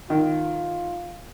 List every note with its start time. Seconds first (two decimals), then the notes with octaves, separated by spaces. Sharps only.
0.10 D#3 F4